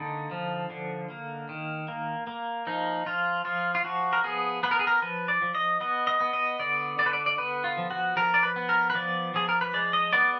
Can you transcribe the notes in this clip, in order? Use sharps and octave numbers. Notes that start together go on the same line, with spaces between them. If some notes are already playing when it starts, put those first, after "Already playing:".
Already playing: D3 A#3 D#4
F3
D3
A#3
D#3
A#3
A#3
F3 D#4
F3 F4
F3 F4
F4
F3 F#4
A#4
B3 G#4
B3 B4
A#4
G#4
A#4
F3 B4
D5
F3
D#5
B3 D#5
D#5
B3
D#5
D3 D5
D3 D5
B4
D5
D5
B3 B4
F4
F3
F#4
F3 A#4
D5
B4
B3
A#4
B4
F3 D5
F3 G#4
A#4
B4
G#3 D5
D#5
B3 D5